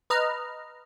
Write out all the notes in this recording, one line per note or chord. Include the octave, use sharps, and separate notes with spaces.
B4 D#5 A#5 F6